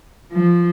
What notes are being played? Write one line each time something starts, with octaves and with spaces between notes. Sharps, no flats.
F3